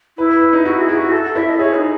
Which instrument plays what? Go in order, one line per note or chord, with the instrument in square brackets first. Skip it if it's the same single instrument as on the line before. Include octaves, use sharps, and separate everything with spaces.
[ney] E4 [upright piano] B4
[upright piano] B4
B4
D#4
[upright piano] E4 [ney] F#4
[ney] G#4
[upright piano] E4
[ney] F#4
A4
[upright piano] E4 [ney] E5
[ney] D#5
[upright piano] G#4 [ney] C#5
[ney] D#4